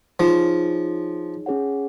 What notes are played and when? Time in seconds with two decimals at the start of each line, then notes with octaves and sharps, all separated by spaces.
0.20 F3 D#4 G#4 C#5
1.46 C#4 G#4 C#5 F#5